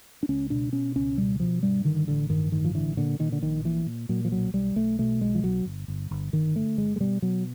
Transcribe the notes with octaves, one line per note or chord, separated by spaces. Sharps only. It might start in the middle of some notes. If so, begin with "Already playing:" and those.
D4
C#2 C#4
B2 D4
B2 C#4
C#2 C#4
B2 G3
B2 F3
G2 G3
D3 D#3
A1 D3
G2 D#3
A1 D#3
F3
D3 E3
A#2 D3
A#2 D#3
D3
A#1 D#3
A#2 E3
A#2
A#2 F#3
F3
B1 F#3
B1 G3
B1 A3
B2 A3
B1 G#3
F3
B1 F#3
G1
G1
G1
G1 D#3
D3 A3
G1 G#3
G#3
B2 G3
B2 F#3